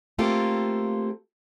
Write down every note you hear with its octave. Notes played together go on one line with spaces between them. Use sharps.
A3 A#3 C4 F4 G4 A4